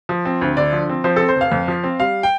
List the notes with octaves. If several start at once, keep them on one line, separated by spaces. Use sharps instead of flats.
F3
C4
D2
D3 D5
F3
C4
F3 C5
C4 A4
C5
F1 F5
F2
F3
C4
G3 F5
G5